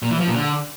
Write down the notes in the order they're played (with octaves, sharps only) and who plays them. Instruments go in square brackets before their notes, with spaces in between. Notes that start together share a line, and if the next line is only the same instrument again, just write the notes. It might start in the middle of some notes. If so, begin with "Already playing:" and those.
[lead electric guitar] A#2
E3
F3
A#2
D3